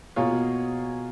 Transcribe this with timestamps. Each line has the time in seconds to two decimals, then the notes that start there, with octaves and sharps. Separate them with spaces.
0.16 B2 A#3 F4 G#4 C#5
0.32 B2